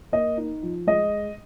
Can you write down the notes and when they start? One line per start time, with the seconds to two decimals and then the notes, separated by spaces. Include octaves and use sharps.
0.12 A#3 D#5
0.37 D#4
0.63 F3
0.87 G#3 D#5